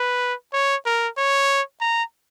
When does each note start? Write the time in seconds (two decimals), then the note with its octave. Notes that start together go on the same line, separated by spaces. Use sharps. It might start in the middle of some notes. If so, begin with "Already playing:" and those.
Already playing: B4
0.53 C#5
0.85 A#4
1.17 C#5
1.81 A#5